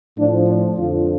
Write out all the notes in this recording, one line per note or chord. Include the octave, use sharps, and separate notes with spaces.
A2 F3 D4
D4
F2 D3 F3 F4